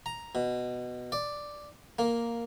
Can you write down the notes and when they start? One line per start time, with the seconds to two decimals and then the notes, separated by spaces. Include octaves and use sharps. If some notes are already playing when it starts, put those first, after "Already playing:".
0.06 A#5
0.35 B2
1.12 D5
1.99 A#3